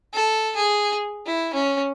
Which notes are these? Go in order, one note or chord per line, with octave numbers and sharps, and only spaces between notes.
A4
G#4
E4
C#4